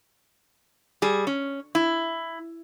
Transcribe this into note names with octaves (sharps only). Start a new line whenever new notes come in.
G3 G#4
C#4
E4